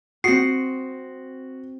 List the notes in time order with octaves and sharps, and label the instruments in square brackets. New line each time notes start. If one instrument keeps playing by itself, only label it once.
[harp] C4 D#6 [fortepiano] F#4 [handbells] C7 C#7